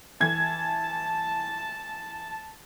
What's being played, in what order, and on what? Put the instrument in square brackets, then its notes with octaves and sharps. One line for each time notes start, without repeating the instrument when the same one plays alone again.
[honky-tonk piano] E3 G#6 [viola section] A5